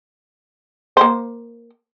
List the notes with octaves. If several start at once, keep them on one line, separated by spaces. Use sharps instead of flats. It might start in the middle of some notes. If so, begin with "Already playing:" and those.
A#3 C5